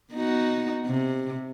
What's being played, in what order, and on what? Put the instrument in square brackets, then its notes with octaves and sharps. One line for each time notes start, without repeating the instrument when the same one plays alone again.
[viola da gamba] B3 D#4 F#4
C3